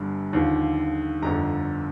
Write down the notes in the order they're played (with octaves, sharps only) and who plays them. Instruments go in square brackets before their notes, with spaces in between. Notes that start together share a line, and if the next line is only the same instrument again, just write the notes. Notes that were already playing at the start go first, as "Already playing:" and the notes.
Already playing: [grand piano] G1 G2 D3
D#2 D3 F3
G1 F2 D3 A#5